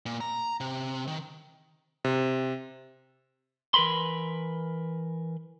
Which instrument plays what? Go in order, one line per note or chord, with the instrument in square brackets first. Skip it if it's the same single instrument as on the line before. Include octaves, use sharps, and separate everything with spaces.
[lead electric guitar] A#2
A#5
C3
D#3
[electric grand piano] C3
[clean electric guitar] E3 A#4 B4 B5 C6